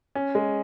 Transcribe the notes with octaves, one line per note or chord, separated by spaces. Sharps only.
C#4
G#3